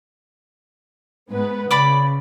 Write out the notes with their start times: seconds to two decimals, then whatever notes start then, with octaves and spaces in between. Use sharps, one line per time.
1.31 G#2 B3 B4
1.71 C#3 D5 B5 D6